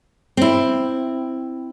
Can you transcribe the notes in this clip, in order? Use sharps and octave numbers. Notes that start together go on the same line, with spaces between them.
C4 E4